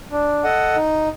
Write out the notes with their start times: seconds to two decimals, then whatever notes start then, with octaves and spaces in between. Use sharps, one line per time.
0.11 D4
0.44 A4 D#5 F#5
0.76 D#4